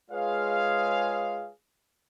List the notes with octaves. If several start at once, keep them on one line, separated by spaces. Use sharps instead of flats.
G#3 F4 G#4 B4 C#5 F5